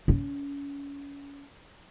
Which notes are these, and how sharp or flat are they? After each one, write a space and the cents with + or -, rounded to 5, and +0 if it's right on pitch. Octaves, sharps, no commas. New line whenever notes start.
C#4 +30